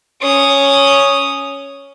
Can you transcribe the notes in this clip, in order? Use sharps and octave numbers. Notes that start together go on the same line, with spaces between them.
C#4 D#6